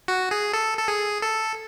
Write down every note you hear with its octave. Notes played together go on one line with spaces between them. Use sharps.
F#4
G#4
A4
A4
G#4
A4